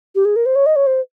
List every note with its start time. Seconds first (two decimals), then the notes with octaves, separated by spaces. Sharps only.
0.15 G4
0.25 G#4
0.36 A#4
0.46 C5
0.56 C#5
0.66 D#5
0.76 C#5
0.87 C5